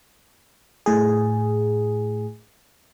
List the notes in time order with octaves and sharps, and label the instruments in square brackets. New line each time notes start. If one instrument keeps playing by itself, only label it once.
[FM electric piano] A2 G#4